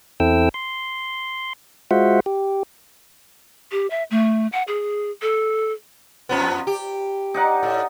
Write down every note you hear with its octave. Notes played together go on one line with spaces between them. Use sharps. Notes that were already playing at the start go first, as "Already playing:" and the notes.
E2 C4 E4 A4 G5 E6
C6
G#3 F4 F#4 C5 E5 F#5
G4
G4
E5
A3
F#5
G#4
A4
F2 F3 B3
G4
D#4 D5 F#5
A2